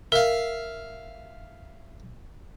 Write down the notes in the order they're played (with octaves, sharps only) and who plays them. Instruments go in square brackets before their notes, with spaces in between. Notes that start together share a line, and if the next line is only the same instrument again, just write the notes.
[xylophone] A#4 [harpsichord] E5 F5